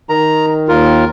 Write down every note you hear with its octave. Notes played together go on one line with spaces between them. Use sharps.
D#3 A#5
D#2 F4 A#4